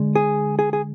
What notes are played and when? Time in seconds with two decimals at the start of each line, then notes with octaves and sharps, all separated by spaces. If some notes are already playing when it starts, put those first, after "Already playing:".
Already playing: D3 G#3
0.15 G#4
0.59 G#4
0.73 G#4